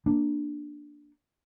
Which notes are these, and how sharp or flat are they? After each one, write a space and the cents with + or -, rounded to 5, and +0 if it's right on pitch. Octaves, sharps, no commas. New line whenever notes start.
A#3 +0 D4 +0